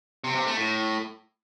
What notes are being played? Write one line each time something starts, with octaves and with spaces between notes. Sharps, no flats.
C3
C3
A3
A2